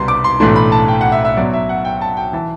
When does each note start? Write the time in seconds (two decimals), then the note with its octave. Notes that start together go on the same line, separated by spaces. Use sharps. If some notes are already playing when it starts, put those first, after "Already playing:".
Already playing: C2 B2 G3 B3 C6
0.08 D6
0.24 C6
0.40 B1 A2 E3 A3 D4 C6
0.56 B5
0.72 A5
0.88 G5
1.01 F#5
1.12 E5
1.25 E5
1.37 B1 B2 F#3 D5
1.53 E5
1.69 F#5
1.85 G5
2.01 A5
2.17 G5
2.33 E3 A5